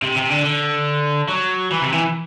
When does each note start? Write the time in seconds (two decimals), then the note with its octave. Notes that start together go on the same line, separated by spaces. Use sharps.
0.02 C3
0.16 C3
0.30 D3
0.44 D3
1.28 F#3
1.71 E3
1.82 C3
1.92 E3